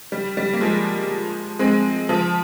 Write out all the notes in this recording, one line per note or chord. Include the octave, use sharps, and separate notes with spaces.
G3
G3
A#3
F3 G#3
G#3 C4
F3